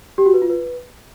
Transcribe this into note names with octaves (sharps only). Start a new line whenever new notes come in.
G4
F#4
B4
F4
B4